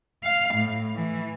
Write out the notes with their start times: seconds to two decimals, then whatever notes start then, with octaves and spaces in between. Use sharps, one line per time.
0.23 F5
0.55 A2
0.96 E3